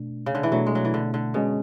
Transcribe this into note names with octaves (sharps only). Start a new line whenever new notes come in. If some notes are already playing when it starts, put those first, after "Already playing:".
Already playing: B2 A3 D4
C#3
D3
E3
B2 F#3 A3 D4
G#3
F#3
E3
D3
D3
B2 G#3 C#4 G#4